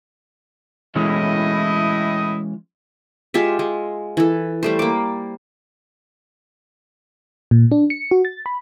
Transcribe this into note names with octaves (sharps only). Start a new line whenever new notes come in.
A2 E3 G#3 C#4 E4 D#5
G#3 F4 G4 E5
G#3
E3 A4
G3 A3 C5
A#3 D6
A#2
D4
C#7
F#4
A6
B5